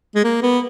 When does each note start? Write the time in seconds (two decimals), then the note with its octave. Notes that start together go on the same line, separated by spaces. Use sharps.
0.15 G#3
0.24 A#3
0.42 B3